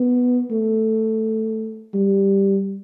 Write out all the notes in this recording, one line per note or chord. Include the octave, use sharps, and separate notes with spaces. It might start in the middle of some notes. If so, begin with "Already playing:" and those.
Already playing: B3
A3
G3